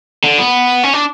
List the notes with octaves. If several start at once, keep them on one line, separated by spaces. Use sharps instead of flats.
D3
B3
C#4
D4